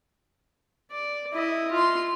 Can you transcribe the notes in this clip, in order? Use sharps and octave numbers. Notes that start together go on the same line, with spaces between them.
D5
E4 D#5
F4 C6